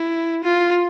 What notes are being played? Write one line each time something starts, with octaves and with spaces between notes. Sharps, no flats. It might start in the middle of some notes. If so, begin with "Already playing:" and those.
Already playing: E4
F4